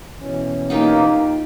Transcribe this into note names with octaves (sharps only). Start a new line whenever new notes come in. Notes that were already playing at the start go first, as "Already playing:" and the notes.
B2 E3 C#4
A#3 D#4 F4 G4